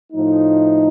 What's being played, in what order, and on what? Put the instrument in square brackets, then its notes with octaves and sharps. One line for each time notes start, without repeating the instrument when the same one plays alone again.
[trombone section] A2 F3 A3 D#4